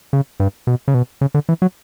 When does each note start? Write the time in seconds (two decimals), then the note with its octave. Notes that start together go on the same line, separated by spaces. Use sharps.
0.13 C#3
0.40 G2
0.67 B2
0.88 C#3
0.94 B2
1.21 C#3
1.34 D3
1.49 E3
1.62 F#3